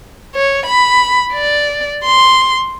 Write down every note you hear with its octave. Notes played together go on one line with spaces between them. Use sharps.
C#5
B5
D5
C6